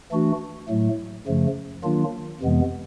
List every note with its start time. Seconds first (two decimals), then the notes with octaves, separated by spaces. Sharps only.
0.12 E3 A3 D4 F#4
0.69 A2 F#3 A3
1.26 F#2 C#3 F3 A3
1.84 D#3 F#3 A#3 D4 F4
2.41 F2 C3 E3 G#3 B3